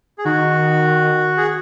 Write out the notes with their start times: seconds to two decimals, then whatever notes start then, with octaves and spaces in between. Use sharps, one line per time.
0.18 G#4
0.25 D#3 F#4
1.38 G#4